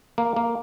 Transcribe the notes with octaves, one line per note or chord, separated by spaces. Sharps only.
A#3
A#3